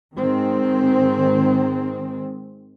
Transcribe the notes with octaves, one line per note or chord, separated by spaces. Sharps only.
G#2 D#3 G#3 C4